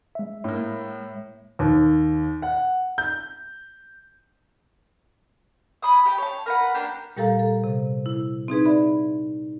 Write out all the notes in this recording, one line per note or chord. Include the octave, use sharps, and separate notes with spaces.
G#3 E5
A2 A#3
D#2
F#5
G6
G#5 B5 D#6
G4 G5 A5
C#5 A5
A#4 B4 F#5
A#3 D4 G4
A#2 G3 G4 A4 F5 A#5
A4
C3
E4
C4 D#4 G#4 B4
D5 E5 B5